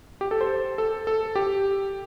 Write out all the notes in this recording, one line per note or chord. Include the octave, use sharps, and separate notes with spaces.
G4
A4
C5
A4
A4
G4